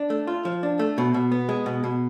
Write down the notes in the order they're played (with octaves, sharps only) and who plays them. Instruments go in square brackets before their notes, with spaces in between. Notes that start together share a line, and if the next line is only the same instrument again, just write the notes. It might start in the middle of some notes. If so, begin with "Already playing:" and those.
Already playing: [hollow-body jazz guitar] D4
A3
F4
F3
D4
A3
B2
B2
B3
G#3
B2
B2